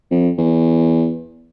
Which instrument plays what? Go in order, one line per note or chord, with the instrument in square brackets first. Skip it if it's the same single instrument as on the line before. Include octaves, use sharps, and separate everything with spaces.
[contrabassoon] F2
E2